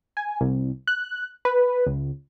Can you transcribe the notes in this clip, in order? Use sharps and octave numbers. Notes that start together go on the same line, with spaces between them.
G#5
C2
F#6
B4
C#2